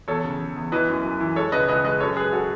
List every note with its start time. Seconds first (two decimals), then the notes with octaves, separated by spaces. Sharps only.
0.08 E2 A4 C#5
0.24 C#3
0.40 C#3
0.56 E2
0.72 E3 B4 D#5
0.88 F#2
1.04 F#2
1.20 E3
1.36 G#3 A4 C#5
1.52 C#2 B4 D#5
1.68 C#2 B4 D#5
1.84 G#3 B4 D#5
2.00 F#2 A4 C#5
2.17 G#3 G#4 B4
2.32 F#4 A4